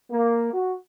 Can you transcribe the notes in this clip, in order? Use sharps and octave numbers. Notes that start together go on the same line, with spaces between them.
A#3
F#4